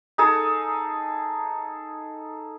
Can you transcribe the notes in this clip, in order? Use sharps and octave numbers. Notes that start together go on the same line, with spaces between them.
D#4 G#4 A4